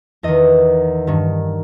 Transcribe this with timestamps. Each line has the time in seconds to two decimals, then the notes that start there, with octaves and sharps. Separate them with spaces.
0.23 E2 D#3 D#5
1.07 G2 D#3